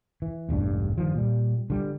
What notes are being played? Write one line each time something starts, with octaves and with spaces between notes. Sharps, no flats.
E3
E1 A1 G2 D4
G2 D#3 F3
A#2 G3
D3 G3